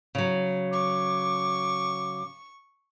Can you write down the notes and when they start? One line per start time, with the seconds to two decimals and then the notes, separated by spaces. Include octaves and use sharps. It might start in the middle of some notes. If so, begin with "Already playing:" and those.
0.15 C#3 F#3
0.72 C#6 D6